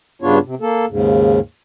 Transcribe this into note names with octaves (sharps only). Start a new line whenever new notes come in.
G2 C#3 B3 D4 F4 C#5
C3
A#3 A4
D#2 G#2 C#3